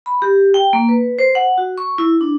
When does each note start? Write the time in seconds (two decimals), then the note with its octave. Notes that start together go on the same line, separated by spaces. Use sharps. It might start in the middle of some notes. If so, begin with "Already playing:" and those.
0.06 B5
0.22 G4
0.54 G5
0.73 A#3
0.89 B4
1.19 C5
1.35 F#5
1.58 F#4
1.78 C#6
1.98 E4
2.21 D4